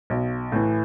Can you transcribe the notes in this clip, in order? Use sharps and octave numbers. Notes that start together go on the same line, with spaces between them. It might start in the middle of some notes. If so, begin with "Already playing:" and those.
B1
A2 E3